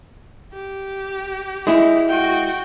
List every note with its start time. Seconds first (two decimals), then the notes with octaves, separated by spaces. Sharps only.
0.53 G4
1.67 G#3 E4
2.09 F#4 G5